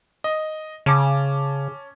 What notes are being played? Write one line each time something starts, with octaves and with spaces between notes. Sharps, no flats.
D#5
C#3 C#4 A5 D6